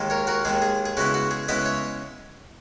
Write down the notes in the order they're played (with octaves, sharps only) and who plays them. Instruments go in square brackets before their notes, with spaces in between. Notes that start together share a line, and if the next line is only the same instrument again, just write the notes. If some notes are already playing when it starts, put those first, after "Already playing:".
Already playing: [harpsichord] D#2 D#3 G#3
A#4 C#5
F#4 A#4
D#2 D#3 G#3 G#4
G#4
G#4
C#3 G#3 B3 E4 F#4
F#4
G#4
C#3 G#3 B3 E4 B4 D#5
C#5 E5